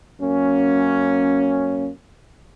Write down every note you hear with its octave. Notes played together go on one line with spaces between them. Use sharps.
F#2 A#3 C#4